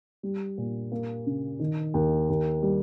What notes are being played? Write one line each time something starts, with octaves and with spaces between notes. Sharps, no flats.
G3
A#2
A#3
C#3
D#3
D#2
D#2
G3